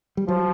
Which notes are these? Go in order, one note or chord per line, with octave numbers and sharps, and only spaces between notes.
G3
F3 F#3